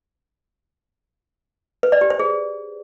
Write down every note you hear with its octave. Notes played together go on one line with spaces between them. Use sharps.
B4
D5
G4
C5
G#4